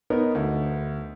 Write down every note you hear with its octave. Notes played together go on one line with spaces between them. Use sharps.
B3 D#4 A#4 B4 C#5
D2